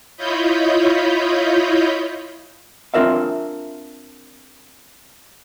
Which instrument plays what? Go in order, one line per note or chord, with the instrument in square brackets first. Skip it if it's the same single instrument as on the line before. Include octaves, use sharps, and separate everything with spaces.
[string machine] E4 F4 C#5 D#5 B5 G6
[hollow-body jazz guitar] C4 D4 F4 A#4 E5 F5